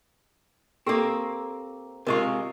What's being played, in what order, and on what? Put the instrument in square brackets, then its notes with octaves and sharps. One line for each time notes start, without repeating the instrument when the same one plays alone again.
[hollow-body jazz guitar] A#3 C4 [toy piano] G4 A4 E6
[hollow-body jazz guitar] C3 G#3 F4 [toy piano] A#4 D#5 C#6